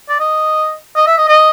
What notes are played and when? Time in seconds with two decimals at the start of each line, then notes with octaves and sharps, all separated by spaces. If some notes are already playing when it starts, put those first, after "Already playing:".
0.09 D5
0.20 D#5
0.96 D#5
1.07 E5
1.18 D#5
1.29 D#5